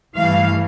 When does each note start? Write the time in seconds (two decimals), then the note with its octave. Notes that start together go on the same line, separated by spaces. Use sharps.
0.14 G2 E3 A3 F5